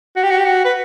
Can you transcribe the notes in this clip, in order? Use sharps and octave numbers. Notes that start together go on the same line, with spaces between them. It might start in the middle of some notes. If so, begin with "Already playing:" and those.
F#4
G4
F#4
G4
F#4
B4